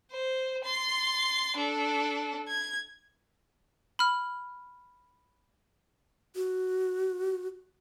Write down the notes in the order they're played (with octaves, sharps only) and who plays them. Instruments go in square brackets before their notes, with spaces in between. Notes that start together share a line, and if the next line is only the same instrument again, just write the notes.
[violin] C5
C6 A6
D4 A4
G#6
[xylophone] B5 F6
[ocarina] F#4